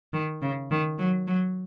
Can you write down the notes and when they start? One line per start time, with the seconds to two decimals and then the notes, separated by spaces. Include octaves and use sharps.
0.13 D#3
0.42 C#3
0.71 D#3
0.99 F#3
1.27 F#3